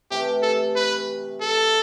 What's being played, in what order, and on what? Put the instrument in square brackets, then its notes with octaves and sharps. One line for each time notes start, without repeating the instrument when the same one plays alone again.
[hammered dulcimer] C3 E3 A3 [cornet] G4
[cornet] A4
B4
A4